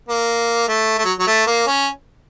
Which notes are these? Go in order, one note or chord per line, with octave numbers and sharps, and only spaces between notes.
A#3
A3
A3
F#3
F#3
A3
A#3
C#4